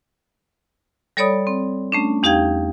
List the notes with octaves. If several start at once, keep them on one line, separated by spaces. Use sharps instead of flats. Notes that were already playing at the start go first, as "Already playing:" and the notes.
G3 A4 C#5 D5 B5 D#6
C4
A3 C#4 D4
E2 D#4 G4 F5 G5 G#6